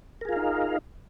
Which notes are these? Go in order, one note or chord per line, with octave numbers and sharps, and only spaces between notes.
D#4 F4 G#4 A#4 F5